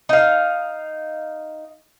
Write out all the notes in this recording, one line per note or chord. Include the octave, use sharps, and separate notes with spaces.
D#4 F5